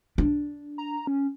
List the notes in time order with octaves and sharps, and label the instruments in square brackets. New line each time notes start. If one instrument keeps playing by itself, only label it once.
[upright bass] D4
[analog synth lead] A#5
C#4